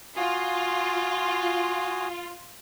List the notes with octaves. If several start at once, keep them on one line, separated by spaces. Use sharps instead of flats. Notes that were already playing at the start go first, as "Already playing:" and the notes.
F4 F#4 G#5 D#6